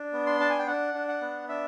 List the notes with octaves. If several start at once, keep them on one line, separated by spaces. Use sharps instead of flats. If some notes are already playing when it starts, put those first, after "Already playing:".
Already playing: D4
B3
C6
D4 A5
G#5
G5
D4 F#5
D4
F#5
B3
D4 E5